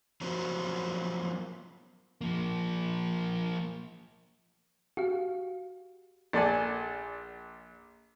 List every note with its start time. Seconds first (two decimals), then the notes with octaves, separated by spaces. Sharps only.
0.21 F3 F#3 B3 F#4 A#4 C5
2.21 F3 A#3
4.97 F#4 G4 F5
6.33 A#1 A4 D5 G#5